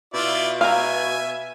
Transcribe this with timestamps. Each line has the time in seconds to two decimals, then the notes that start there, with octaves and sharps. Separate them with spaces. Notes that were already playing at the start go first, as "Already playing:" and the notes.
0.14 B2 E4 F4 D5
0.61 E5 F5 G#5 A#5